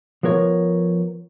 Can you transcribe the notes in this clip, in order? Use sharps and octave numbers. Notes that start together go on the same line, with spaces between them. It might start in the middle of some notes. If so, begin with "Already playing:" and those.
F3 B3 A#4 C#5